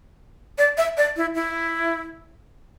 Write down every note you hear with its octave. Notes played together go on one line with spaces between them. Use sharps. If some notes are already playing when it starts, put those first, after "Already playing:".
D5
E5
D5
E4
E4